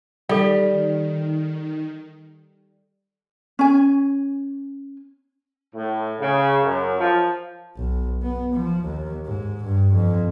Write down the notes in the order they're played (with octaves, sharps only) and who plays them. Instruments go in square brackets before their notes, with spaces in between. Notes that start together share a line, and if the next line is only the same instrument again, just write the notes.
[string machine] D#3 [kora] G3 [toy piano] A4 F5
[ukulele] C#4 G#5
[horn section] A2
C#3
F#2
F3
[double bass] B1
B3
F3
D#2
G#2
G2
F2